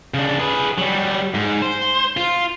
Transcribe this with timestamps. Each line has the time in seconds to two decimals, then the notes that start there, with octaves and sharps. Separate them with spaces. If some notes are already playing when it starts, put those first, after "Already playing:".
0.14 C#3 D4
0.39 G#4 B4
0.78 F#3 G3
1.34 G#2
1.62 C5
2.17 F4